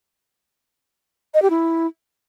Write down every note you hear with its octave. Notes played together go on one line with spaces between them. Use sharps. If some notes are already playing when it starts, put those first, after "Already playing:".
D#5
G4
E4